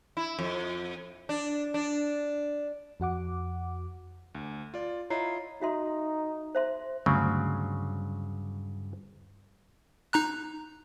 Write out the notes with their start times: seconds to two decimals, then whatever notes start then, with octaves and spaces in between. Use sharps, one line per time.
0.17 E4
0.39 F2
1.29 D4
1.74 D4
3.00 F2 F#4 F#5 D6
4.35 D2
4.74 F4 D5
5.10 E4 F4 C#5 D#5 A#5 C7
5.62 D#4 F#4 E5 C6
6.55 C5 E5 C6
7.06 D2 G2 C#3 F#3 C4
10.13 D#4 A#5 F#6